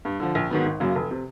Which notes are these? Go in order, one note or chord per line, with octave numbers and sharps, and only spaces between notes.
G2
D3 F3
A#1
G#2 D#3 F#3 B3
G#1
F#2 C#3 F#3 A#3
F1
C3